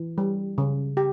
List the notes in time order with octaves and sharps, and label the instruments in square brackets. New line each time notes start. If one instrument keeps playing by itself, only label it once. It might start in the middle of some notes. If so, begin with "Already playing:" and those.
Already playing: [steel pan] E3
G3
C#3
G4